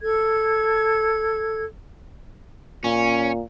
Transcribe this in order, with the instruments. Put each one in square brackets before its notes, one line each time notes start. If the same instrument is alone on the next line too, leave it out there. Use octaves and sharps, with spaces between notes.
[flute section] A4 G#6
[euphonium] A#2 [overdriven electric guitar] C#4